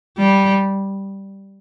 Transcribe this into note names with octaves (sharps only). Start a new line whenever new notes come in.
G3